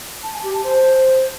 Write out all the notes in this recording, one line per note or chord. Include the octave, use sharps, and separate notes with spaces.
A5
G#5
G4
A5
C5